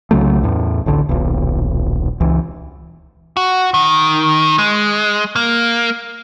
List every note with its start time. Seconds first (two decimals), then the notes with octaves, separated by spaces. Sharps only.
0.11 C2 C#3 F#3 A3
0.43 E2 A2
0.86 A1 D2 D3
1.09 D#1 B1
2.20 C#2 E3
3.37 F#4
3.74 D#3
4.58 G#3
5.36 A#3